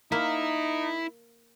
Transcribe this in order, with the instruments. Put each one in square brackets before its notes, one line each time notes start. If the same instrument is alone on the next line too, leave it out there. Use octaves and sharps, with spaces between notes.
[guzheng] A#3 [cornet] D#4 [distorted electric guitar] E4